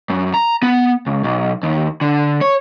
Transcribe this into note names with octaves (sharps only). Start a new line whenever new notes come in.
F#2
A#5
B3
C#2
B1
D#2
D3
C#5